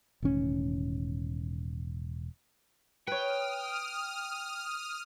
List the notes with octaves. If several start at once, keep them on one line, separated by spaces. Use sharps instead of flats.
E1 A2 D#3 C#4
B4 C#5 G5 D#6 F6